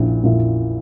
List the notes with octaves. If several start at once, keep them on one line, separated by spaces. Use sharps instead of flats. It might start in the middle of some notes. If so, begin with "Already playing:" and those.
Already playing: A#1 A#2 E4
A#2 A#3 E4